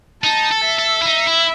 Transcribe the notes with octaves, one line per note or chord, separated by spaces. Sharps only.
D#4 A5
A4
E5
A4
E4
D#4
E4